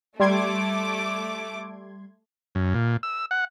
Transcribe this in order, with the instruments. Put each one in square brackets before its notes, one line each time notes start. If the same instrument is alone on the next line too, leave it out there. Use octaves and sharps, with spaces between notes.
[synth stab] G3 C6 G#6 [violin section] A3 D6
[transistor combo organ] F#2
A#2
E6
F#5